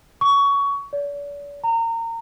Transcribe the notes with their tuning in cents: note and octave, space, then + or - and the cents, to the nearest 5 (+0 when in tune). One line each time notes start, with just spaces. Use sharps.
C#6 +20
D5 -40
A#5 -30